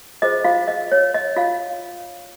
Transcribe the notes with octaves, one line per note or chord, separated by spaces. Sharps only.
F4 G#4 C5 D#5
F4 F5
D#5
C#5
D#5
F4 F5